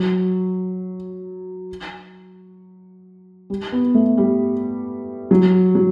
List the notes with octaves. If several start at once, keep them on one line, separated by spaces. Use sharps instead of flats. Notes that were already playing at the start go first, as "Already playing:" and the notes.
Already playing: F#3
G3
B3
A3
G3
F#3
F#3